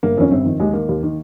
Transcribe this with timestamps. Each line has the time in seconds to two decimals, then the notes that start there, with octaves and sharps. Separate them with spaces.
0.03 G1 A#3
0.17 F2 D#3 C#4
0.31 G1 C4
0.45 F2 D#3
0.60 D#2 G#3
0.73 D#3 A#3
0.89 D#2
1.03 D#3